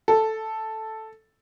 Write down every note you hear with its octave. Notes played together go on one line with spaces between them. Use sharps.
A4